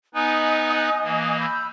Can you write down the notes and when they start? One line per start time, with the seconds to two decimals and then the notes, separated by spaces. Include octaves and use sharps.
0.14 B3 D#4 B4 D#5 G#5 D#6
1.04 E3 A#3
1.39 B5 E6 G6